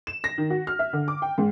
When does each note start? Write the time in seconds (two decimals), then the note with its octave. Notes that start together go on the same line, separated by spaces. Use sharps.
0.07 E7
0.24 A#6
0.38 D#3
0.50 F#4
0.67 F6
0.79 E5
0.93 D3
1.08 D6
1.22 G5
1.38 G#2